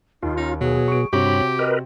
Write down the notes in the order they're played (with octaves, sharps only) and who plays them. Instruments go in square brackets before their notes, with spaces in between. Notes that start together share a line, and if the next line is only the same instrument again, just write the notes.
[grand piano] D#2 [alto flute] D#4 [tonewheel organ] F4
[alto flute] C#4 [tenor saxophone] D#4
[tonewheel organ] B2 [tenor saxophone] F#3 [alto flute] G#4
[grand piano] C#6 D7
[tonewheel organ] G2 B5 [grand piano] C3 F#4 C#6 [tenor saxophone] G4 [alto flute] C#5
[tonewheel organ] A#4 B4 [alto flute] D#5